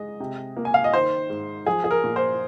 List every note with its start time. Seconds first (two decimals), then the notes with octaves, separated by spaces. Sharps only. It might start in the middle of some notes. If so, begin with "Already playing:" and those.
Already playing: G#3 D#5
0.20 C3
0.57 A#3
0.65 G#5
0.74 F5
0.84 D#5
0.93 D#3 C5
1.30 G#2
1.66 F3 G#4
1.84 G#4
1.91 A#4
2.04 A#2
2.16 C5